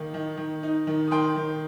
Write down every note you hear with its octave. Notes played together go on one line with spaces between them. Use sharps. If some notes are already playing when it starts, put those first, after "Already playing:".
Already playing: D#3 A#3 D#4
D#3
D#3
D#4
D#3
D#6
D#3 G5 C6
D#3